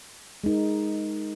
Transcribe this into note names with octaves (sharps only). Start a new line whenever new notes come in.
G#3 D#4 A#4